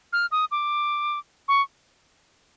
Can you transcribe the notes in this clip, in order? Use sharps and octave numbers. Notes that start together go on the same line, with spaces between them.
F6
D#6
D6
C#6